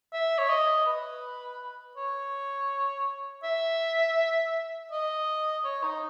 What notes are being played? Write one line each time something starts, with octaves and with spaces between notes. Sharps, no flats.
E5
C#5
D#5
B4
C#5
E5
D#5
C#5
D#4